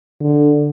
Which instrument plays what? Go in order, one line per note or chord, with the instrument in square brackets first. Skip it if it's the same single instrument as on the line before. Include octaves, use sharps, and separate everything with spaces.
[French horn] D3